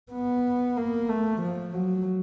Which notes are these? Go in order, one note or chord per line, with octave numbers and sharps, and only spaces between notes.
B3
A#3
A3
F3
F#3